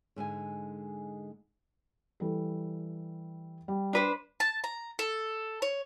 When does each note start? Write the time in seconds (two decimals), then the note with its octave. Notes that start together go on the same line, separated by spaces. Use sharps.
0.16 G#2 D3 G#3 G#5
2.20 E3 G3 A4
3.68 G3
3.93 D4 B4 C5
4.40 A5
4.64 A#5
4.99 A4
5.62 C#5